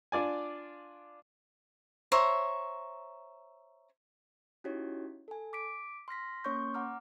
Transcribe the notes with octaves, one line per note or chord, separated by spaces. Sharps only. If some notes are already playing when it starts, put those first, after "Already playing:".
D4 F4 D5 G#5
C5 C#5 E5 A#5
C#4 D#4 E4 F#4 G4 C#5
A4 G#5
D6 B6 D7
C6 F6 A#6 B6
A#3 C#4 C#5 C6 C#6 G6
F#5 A#5 D6 F6